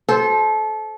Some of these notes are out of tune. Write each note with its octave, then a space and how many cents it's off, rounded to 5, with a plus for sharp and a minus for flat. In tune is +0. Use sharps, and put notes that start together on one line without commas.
A4 -25 C5 +0